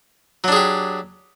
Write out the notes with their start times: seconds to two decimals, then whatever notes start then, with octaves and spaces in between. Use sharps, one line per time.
0.44 F#3
0.48 D4
0.52 G#4
0.56 G4